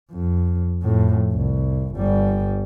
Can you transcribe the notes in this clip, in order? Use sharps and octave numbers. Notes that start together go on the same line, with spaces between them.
F2
F2 A2
C2
G1 G3